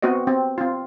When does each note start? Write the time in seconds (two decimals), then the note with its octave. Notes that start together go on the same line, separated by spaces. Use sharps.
0.02 B3 C4 F#4 C5 D#5
0.27 C4
0.58 C4 F4